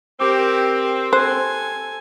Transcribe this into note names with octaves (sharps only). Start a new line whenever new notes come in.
C4 G4 A#4 D6
A4 C5 G#5 F#6